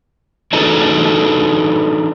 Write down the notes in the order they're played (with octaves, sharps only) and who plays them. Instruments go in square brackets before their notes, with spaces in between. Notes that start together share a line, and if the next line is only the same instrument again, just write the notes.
[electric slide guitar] D4 D#4 F#4 G#4 A4 B4